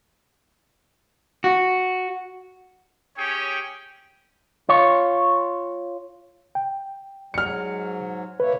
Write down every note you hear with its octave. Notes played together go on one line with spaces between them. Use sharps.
F#4
C#4 G4 G#4 C#5 G5
F4 C#5
G5
G#2 F#3 F6 C#7
A#3 E4 B4 C#5